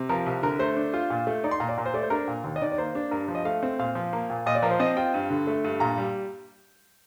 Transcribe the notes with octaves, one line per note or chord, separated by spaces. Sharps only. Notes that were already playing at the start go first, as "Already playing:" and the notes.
Already playing: C3
F3 A#4
C2
D3 A#4
A3 C5
D4
F4
A#2
A3
D#4 D5
C6
A#2 A#5
D5
A#2 A#4
C5
A3 D5
C5
D4 A#4
A#2
D#2
D#5
D#3 D5
D5
A#3 C5
D4
G2 A#4
F3
D#5
A3 F5
C4
A#2 F5
F3
A#3
A#2
A#2 D#5
D5
F3 A#4
C5
C4 D#5
F4 G5
G2
D3
A3
G2
A#2 A#5
G3